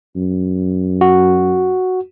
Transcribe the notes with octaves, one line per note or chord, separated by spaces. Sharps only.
F#2
F#4